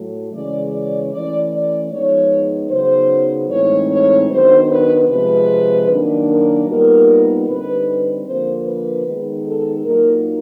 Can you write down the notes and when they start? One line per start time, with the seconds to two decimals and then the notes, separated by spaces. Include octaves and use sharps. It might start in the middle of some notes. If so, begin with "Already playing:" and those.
Already playing: A2 F#3 A3
0.33 C#3 E3 G#3 C#4 D5
0.72 D5
1.12 E3 A3 C#4 D5
1.52 D5
1.92 F3 G#3 B3 D#4 C#5
2.70 C#3 F#3 B3 D#4 C5
3.50 A2 E3 G#3 C4 D#4 C#5
3.90 C#5
4.30 D#3 F#3 B3 D4 C5
4.69 B4
5.09 C3 F3 G#3 B4
5.89 D#3 F#3 A#3 D4
6.28 A#4
6.67 A#2 G3 B3 D#4 A#4
7.47 D3 G3 C4 D#4 B4
8.26 D3 F3 A#3 C5
8.66 B4
9.05 D#3 G#3 B3 D#4
9.45 A4
9.84 A#2 F#3 A#3 D#4 A#4